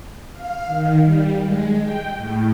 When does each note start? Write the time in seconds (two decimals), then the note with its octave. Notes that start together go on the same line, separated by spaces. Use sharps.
0.32 F5
0.66 D#3
1.04 G3
1.42 G#3
1.82 G5
2.16 A2